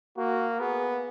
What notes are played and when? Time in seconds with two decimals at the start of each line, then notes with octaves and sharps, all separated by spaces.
0.17 A#3 F#4
0.60 B3 G#4